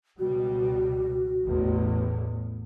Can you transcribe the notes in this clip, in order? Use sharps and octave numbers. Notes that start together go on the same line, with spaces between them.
C#2 B2 G3 F#4
A1 E2 A2